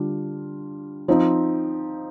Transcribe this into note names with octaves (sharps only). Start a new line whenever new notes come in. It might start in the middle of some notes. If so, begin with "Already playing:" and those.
Already playing: D3 G3 D4 F4
F3 C4 D#4